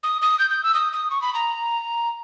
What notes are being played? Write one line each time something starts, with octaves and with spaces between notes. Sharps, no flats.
D#6
D#6
G6
G6
E6
D#6
D#6
C#6
B5
A#5